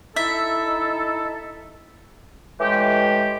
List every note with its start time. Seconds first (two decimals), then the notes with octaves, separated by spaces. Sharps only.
0.16 D#4 E4 A4 E5
2.60 A2 E3 G#3 G4